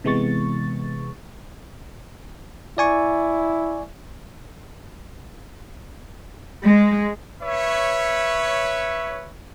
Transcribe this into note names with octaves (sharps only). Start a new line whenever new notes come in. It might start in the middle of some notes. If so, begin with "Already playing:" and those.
C3 E3 G#3 B3 C#6 A6
E4 D5 G#5 C#6
G#3
B4 C#5 E5